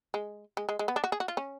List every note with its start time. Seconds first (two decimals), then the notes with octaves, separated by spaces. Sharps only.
0.14 G#3
0.57 G#3
0.69 G#3
0.79 G#3
0.88 B3
0.96 D4
1.04 F#4
1.12 G#4
1.20 F#4
1.28 F4
1.37 C#4